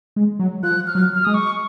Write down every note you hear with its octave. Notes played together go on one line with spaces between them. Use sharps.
G#3
F#3
F3 F#6
F6
F#3
F6
G#3 D#6
C#6